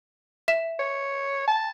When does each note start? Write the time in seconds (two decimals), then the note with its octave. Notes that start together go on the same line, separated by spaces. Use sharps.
0.48 E5 E7
0.79 C#5
1.47 A5